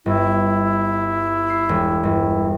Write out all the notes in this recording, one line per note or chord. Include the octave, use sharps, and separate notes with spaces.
G1 E4
C7
E1
G1